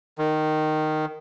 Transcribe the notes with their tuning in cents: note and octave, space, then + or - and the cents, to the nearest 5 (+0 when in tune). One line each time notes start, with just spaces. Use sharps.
D#3 -10